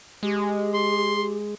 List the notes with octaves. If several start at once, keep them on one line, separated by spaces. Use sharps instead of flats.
G#3 G4
C6